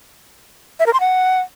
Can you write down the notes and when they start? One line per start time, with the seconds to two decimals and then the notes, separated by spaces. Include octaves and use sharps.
0.80 E5
0.86 A#4
0.93 C6
1.00 F#5